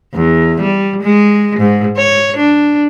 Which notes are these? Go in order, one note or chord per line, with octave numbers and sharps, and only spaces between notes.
E2
G3
G#3
G#2
C#5
D4